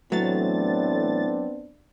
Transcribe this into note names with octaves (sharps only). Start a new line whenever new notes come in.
A2 E3 F#3 A3 B3 C4 D4 A6